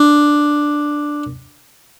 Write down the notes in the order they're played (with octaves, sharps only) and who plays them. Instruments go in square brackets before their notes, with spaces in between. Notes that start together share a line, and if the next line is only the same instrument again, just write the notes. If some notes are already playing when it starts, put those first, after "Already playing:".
Already playing: [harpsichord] D4